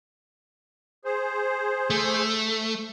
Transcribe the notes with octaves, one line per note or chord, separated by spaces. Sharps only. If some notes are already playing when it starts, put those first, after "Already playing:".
G#4 C5
A3